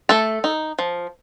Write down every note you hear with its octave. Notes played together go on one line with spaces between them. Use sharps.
A3 A4
D#4
F3